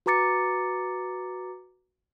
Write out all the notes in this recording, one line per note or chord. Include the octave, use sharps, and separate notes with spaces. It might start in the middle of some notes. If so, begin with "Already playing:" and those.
F#4 B4 A#5 D6 A6 C#7